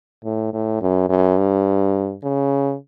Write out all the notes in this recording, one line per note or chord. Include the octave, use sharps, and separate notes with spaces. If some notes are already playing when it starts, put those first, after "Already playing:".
A2
A2
F#2
F#2
G2
C#3